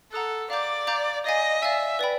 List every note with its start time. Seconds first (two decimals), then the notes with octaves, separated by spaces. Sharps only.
0.12 A4 F#5 A#5 D#6 F#6
0.50 D5 F5 A#5 D6 G6
0.87 F5 A#5 D6 G6
1.24 D5 D#5 F5 G#5
1.62 D5 E5 F5 G#5
1.99 B4 D5 G5 B5